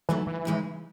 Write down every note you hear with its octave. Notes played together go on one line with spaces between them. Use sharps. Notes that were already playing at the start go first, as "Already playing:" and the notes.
G#2 E3 F#3 A3 E4
E3
D#2 C#3 G#3 D#4